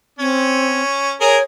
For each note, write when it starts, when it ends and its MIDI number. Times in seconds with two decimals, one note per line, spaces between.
0.19 0.82 60
0.19 1.13 61
1.21 1.38 68
1.21 1.38 70
1.21 1.43 73